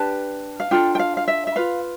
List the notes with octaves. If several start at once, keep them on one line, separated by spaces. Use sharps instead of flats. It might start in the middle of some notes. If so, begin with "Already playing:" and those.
Already playing: D4 G4 B4 A5
F5
D4 F4 A4 G5
G5
F5
F5
E5
E5
F4 B4 F5